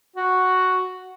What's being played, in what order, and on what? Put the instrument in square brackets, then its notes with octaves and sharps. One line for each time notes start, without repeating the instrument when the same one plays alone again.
[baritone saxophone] F#4